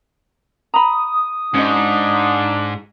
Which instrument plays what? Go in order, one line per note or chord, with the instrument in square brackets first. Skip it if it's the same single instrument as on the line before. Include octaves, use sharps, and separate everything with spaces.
[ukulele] A#5 B5 [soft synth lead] D#6
[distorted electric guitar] G#2 [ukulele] C#4 F#4 D#5 [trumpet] D4